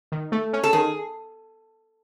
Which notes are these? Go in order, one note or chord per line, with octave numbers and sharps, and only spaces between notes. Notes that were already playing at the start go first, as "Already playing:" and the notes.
D#3
A3
C#4
A4
D#3 G#4